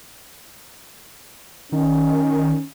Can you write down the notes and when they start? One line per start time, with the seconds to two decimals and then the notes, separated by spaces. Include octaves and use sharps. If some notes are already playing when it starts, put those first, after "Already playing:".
1.72 D#3 C#4